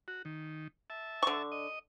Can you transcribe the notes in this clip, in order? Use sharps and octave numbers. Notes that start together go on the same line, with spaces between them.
F#4
D#3
E5 A5
D3 C#6
D#5